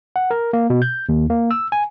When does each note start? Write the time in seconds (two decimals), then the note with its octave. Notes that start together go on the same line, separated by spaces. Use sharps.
0.16 F#5
0.31 A#4
0.53 A#3
0.70 B2
0.82 G6
1.09 D#2
1.30 A#3
1.51 E6
1.72 G#5